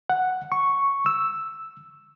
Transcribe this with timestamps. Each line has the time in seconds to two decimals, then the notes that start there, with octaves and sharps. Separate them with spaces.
0.10 F#5
0.52 C#6
1.06 E6